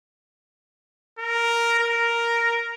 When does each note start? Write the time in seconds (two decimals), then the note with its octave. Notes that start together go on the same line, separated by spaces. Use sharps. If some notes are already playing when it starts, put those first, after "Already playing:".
1.19 A#4
1.79 A#4